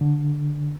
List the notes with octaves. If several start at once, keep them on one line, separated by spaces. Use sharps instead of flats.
D3